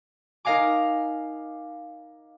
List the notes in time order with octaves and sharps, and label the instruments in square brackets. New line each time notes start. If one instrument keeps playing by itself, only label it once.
[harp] D#4 A#4 D#5 F5 G#5 D6